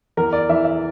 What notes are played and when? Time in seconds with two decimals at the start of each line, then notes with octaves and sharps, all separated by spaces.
0.17 E2 A#4
0.33 D5
0.49 E3 E5
0.65 E5